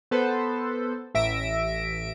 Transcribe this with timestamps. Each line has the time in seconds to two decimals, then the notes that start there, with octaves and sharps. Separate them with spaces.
0.11 B3 A4 B4 C5
1.15 A1 E5 A#6 D7